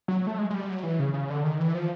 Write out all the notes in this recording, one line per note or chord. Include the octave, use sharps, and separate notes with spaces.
F#3
A3
G#3
G#3
G3
F#3
E3
C#3
C#3
D3
D#3
E3
F3